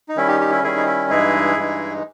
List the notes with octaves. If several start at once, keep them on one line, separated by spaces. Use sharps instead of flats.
D#4
D#3 G3 C#4 E4
D#4 G4
D#4 G4
E4
D#3 G3 C#4 E4 G#4
D#4
E4
G2 E3 G#3 D#4 E4 G#4
G2 E3 G#3 D#4